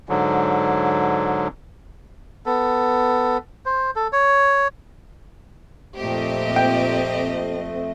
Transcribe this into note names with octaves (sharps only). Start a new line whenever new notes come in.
G#2 D3 F#3
B3 A4
C5
A4
C#5
F2 A#2 A3 C4 G4 D#5
G5